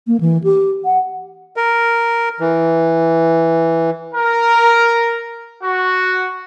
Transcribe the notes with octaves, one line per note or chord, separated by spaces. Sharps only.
A#3
E3
G4
F#5
A#4
E3
A#4
F#4